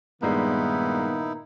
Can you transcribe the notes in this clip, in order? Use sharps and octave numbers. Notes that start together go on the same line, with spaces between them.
G2 A#2 D#3 G3 G#3 B3 D#4 E4